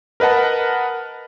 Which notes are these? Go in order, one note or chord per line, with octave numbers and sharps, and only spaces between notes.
A#4 B4 D#5 F#5 A5